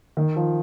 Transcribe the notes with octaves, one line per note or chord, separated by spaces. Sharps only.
D#3
F3